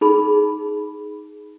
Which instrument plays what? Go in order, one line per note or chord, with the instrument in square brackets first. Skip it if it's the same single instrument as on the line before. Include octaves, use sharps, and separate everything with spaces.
[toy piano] D#4 G#4 B5